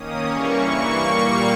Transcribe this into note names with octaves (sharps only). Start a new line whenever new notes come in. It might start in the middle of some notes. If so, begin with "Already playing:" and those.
Already playing: D#3 A#3 C#4 D#6
C#3 E3 G3 A#3 C#4 C#6
G2 E3 A#3 E4
A#2 G3 A#3